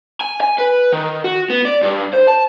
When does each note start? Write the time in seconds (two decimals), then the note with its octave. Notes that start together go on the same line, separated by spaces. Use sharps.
0.21 G#5
0.41 G#5
0.58 B4
0.92 D#3
1.24 F#4
1.50 B3
1.65 D5
1.83 G2
2.13 C5
2.27 A5